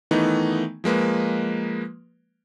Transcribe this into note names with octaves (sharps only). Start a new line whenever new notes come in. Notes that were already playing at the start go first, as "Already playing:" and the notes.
D#3 E3 A3 B3 D#4
F3 G#3 A#3 B4